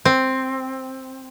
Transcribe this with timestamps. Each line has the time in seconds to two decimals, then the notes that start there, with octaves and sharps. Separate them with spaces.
0.05 C4